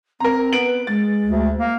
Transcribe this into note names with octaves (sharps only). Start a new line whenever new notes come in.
C4 A#4 A#5
B3 D7 F#7
B4
G#3 A6
D2
A#3 F5